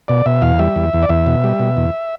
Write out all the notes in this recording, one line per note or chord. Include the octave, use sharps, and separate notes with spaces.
B2 D5
B2 E5
E2 F5
G3 E5
E2
E2
D5
E2 E5
B2
G3
B2
E2